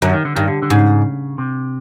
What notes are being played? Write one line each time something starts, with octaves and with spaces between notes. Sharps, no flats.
F#2 D3
D#3
D3
G2 D#3
D3
D3
G#2 C#3
C3